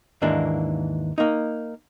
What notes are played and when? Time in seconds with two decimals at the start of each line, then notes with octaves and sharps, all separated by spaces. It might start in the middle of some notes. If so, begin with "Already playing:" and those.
0.22 D#2 G#2 E3 A#3 D4
1.18 A#3 D#4